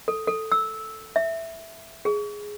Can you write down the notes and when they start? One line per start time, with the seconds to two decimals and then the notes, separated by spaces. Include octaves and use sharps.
0.08 A4
0.27 A4
0.52 E6
1.16 E5
2.05 G#4